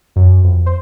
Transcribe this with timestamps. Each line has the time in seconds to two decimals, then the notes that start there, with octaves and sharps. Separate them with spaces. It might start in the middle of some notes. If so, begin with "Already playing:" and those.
0.16 F#2
0.44 F2
0.66 C5